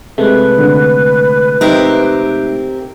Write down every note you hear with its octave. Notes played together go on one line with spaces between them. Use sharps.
C3 G#3 A3 B4
D3
C4 D#4 G4 A#4 E5